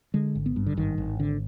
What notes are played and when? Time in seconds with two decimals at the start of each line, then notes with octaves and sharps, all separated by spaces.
0.14 D3 G#3
0.35 G#1
0.46 B3
0.56 G2
0.66 D3
0.77 G#1 D#3
0.98 G#1
1.20 D3